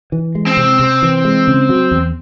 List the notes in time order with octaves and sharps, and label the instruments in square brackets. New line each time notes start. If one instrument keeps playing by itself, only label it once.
[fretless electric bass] E3
G#3
[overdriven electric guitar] C4
[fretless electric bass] C3
C3
E3
G#3
C#3
F#3
E2